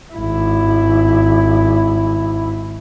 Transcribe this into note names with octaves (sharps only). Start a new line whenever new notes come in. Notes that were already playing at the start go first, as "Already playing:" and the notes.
G#1 E4